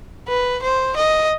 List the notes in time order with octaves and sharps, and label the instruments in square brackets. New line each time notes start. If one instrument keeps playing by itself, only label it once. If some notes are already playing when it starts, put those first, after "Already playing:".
[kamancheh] B4
C5
D#5